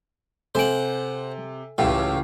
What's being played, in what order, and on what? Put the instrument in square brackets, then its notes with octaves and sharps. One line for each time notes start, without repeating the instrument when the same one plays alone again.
[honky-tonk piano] C3 [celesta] A4 G#5 D7 [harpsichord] C5 F#5
[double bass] C#2 C#3 [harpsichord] A2 [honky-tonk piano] E3 G4 F5